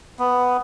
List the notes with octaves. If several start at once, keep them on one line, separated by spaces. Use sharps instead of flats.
B3